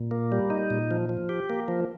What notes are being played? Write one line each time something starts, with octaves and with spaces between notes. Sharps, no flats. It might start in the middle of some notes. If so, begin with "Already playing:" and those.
Already playing: A#2
A#3
G3
D#4
A#2
F3
F3
G4
A#3
F3